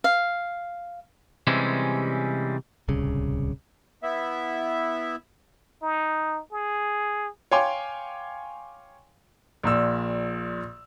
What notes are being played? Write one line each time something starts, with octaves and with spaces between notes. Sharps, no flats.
F5
C3 E3 G3 G#3 C#4
D1 C2 C#3
B3 E4 E5
D#4
G#4
C#5 F5 G5 G#5 C6 D6
A#1 A#2 E6